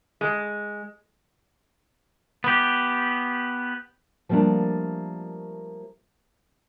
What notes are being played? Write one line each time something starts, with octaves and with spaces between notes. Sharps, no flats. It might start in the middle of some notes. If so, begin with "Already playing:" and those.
G#3
B3 G4
F3 G3 A3 A#3 D4 F4